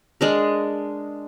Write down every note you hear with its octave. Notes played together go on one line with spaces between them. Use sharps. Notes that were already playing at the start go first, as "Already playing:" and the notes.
G#3 D4 A#4